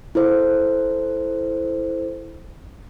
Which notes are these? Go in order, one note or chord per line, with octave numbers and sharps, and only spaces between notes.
E4 A4 C5